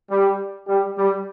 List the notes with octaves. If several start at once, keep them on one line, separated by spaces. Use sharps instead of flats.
G3
G3
G3